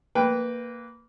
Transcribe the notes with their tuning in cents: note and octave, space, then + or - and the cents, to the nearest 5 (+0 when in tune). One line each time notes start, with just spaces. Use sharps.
A#3 -10 B4 +0 G5 +5